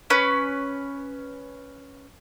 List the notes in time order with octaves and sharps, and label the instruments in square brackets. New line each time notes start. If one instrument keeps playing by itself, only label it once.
[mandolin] C#4 B4